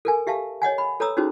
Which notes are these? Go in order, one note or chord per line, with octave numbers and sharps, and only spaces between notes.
A4 A#4 G#5
G4 E5 F5 A5
C#5 D#5 F#5 G#5
B5
A4 B4 C#5 A#5 D#6 E6
C#4 D#4 F#4 G#4 C5